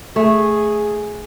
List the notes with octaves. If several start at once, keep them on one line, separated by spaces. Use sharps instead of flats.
A3 G#4